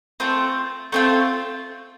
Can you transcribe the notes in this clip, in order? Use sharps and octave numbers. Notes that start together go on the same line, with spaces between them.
A3 C4 F4
A3 C4 F4